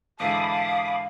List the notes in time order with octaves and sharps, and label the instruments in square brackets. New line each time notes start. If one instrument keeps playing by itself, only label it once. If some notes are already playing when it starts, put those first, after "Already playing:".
[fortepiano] G#2 D3 E3 [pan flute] F5 [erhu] A5 [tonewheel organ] B5 D6 D#6